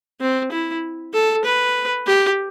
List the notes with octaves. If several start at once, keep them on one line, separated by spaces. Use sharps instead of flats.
C4
E4
A4
B4
G4